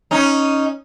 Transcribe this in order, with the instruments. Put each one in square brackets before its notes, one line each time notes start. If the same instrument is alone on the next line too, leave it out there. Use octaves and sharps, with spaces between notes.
[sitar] C#4 D#4